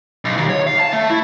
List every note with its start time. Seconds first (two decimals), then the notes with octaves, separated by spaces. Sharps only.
0.25 B1
0.37 D#2
0.50 C#5
0.67 F5
0.80 A5
0.93 A3
1.10 E4